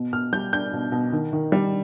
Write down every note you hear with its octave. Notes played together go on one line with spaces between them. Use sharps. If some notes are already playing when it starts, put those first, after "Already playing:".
Already playing: B2
B2 F6
G3 G6
D4 G6
B2
B2
D#3
D#3
G3